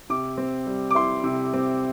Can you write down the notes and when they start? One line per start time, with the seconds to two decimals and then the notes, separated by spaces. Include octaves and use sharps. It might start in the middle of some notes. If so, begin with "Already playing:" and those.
0.10 C3 D6
0.38 C4
0.66 G3
0.91 D6
0.95 E4 C6
1.24 C3
1.53 C4